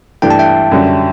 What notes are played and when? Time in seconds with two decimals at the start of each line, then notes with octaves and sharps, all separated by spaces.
0.22 G2 E3 A3 D4 G4 G5
0.30 A5
0.39 E5 G5
0.72 F#2 D3 G3 C#4 F#4